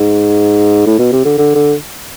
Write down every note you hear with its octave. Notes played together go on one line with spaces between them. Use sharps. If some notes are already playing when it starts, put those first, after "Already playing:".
Already playing: G#2
A2
B2
C3
D3
D3
D3